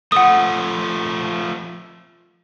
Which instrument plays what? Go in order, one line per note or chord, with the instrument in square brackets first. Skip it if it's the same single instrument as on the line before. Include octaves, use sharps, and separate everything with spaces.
[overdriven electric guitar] F3 A3 [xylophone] F#5 D#6